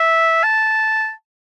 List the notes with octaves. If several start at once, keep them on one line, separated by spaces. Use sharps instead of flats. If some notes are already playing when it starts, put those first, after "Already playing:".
Already playing: E5
A5